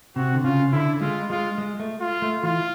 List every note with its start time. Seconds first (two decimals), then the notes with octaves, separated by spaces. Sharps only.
0.16 C3 F#4
0.34 D3
0.44 C#3 F4
0.72 D3 E4
1.01 G#3 F4
1.30 G#3 F4
1.58 G#3
1.80 A3
2.01 F4
2.22 A3
2.43 E3 F4